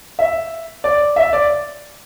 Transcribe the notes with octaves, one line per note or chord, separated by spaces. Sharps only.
E5
D5
E5
D5